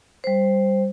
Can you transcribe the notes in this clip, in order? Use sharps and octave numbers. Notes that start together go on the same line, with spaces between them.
G3 C5